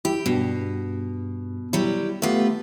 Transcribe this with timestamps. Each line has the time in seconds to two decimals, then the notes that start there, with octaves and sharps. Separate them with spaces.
0.05 E4 G4
0.26 G2 B2
1.73 F#3 G3 E4
2.22 A3 B3 F4 G4 B4